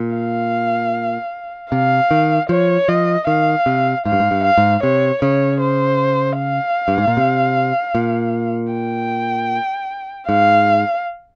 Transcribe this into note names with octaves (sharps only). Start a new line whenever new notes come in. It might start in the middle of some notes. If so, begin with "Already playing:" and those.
Already playing: A#2
F5
C3 F5
D#3
F3 C#5
F3 D#5
D#3 F5
C3
G#2 F5
G2
G#2
G2
F5
G#2
C3 C#5
C#3 C#5
C5
F5
G2
G#2
A#2
C3
A#2
G5
G#2 F5